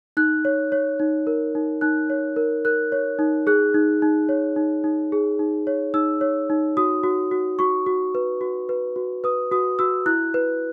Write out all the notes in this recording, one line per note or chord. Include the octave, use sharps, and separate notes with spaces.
D#4 F#6
C#5
C#5
D#4
A#4
D#4
D#4 F#6
C#5
A#4
A#4 F#6
C#5
D#4
G#4 F#6
D#4
D#4
C#5
D#4
D#4
G#4
D#4
C#5
D#4 E6
C#5
D#4
F#4 D#6
F#4
F#4
F#4 C#6
F#4
B4
F#4
B4
F#4
B4 D#6
F#4 D#6
F#4 E6
E4 F#6
B4